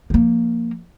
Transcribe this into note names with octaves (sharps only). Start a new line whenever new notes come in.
F3 A#3